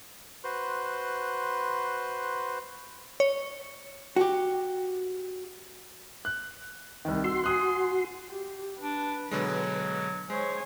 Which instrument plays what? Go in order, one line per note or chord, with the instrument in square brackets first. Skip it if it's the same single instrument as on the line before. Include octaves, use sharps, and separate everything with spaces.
[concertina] F#4 B4 C5 C6 F#6
[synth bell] C#5
[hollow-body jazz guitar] F#4 G4
[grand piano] F#6
C2 D#3
[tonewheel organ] F#4 C6 [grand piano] E6
[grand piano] G#5 D#6 F#6
[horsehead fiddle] G4
[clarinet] D4 [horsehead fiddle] B4
[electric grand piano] B2 D3 G#3 [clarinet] F#3
[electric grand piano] G#3 [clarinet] C5 [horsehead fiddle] C#5 G#5